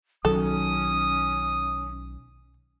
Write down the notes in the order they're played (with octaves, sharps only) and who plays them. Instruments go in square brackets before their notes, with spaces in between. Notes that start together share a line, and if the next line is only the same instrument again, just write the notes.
[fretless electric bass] B1 D#3 F#3 [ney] C#4 [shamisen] A4 [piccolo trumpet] D#6